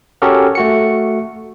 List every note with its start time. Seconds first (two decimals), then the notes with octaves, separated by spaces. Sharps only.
0.22 C#4 F#4 G4 A4 A#4
0.55 A3 F#4 C#7